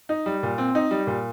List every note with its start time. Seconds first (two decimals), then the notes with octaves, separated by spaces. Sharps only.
0.09 D#4
0.26 G3
0.43 A#2
0.58 C4
0.75 D#4
0.91 G3
1.07 A#2